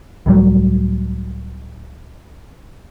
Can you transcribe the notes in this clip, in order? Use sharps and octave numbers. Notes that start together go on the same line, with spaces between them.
C#2 A2 F#3 G3